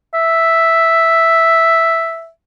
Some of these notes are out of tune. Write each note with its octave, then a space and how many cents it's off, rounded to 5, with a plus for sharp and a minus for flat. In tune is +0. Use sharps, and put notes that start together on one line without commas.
E5 +0